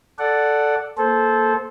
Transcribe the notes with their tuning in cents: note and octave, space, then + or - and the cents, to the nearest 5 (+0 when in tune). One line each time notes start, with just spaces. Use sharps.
A4 +0 D5 +0 F#5 +0
A#3 +0 A4 -20 C5 +0